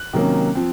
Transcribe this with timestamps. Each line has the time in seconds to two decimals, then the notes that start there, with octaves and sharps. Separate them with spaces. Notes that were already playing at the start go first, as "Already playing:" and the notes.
Already playing: F#6
0.13 C3 D#3 F#3 A#3 C#4
0.55 F3 C4